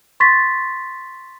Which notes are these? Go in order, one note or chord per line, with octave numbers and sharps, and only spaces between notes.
C6 C#6 A6 B6